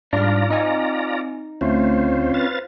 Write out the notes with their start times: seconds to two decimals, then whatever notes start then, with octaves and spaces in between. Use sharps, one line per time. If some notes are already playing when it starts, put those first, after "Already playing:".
0.13 G#2 G3 D4 F4 D5 A#5 F6
0.50 C4 D#4 G#5
1.61 D2 A3 C4 C#4 F4 C5
2.34 B4 C5 F5 A6